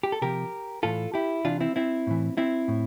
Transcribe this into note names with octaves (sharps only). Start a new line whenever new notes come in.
G4
A4
C3 F3 G4 A#4
A2 E3 F4 A4
E4 G4
C3 E3 D4 F4
C4 E4
C4 E4
A2 E3
C4 E4
A2